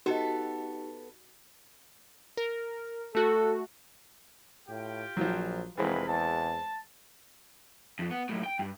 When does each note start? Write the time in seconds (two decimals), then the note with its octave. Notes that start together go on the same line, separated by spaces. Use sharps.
0.06 B3 D#4 F#4 G4 A4 D#5
2.37 A#4
3.15 A3 F#4 A4
4.69 A2 F4 G4 G5
5.17 A#1 F3 F#3
5.77 F1 E3 G#3 C4 A#4 B4 B5
6.08 E2 A5
7.99 F2
8.11 B3
8.29 F#2 A2
8.43 G5
8.59 G2